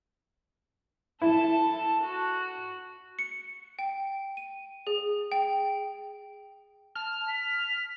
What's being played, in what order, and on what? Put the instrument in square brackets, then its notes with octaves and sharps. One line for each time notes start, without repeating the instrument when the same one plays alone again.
[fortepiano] E4 [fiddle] A4 A5
[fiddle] F#4
[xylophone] C#7
G5
D#7
G#4
G5
[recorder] A5 [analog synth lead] F6
[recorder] B6